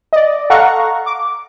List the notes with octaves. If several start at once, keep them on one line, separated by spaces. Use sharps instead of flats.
D5 D#5
A4 F5 F#5 A#5 C#6
D6